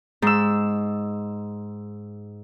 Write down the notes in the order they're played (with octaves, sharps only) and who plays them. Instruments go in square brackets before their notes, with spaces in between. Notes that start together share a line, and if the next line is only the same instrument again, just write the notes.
[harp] G#2 E6